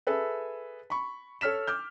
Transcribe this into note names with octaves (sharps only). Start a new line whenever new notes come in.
G#4 A4 B4 E5
B5 C#6
A4 C#5 F6 B6 E7
D6 F6 G6